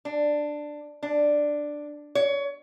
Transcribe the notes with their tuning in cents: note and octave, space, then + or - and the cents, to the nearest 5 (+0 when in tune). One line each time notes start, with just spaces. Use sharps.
D4 +10
D4 +5
C#5 +25